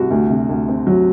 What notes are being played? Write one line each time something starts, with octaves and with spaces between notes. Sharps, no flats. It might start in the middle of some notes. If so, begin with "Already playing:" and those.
Already playing: C2 F#4
D2
C3
D2
C4
F#3